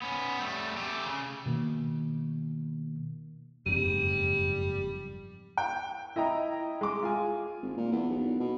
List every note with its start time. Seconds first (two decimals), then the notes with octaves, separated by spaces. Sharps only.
0.02 B3 C#4
0.39 G3 A3
0.77 A3 G4
1.06 C#3
1.46 B2 D#3 A#3
3.66 F#1 F2 G#2 G3
5.58 G5
6.16 E4 D#5 G5 A#5
6.81 G#3 D6
7.02 F4 G#4 G#5
7.62 G#1
7.77 A#2
7.92 E2
8.09 B1
8.39 B2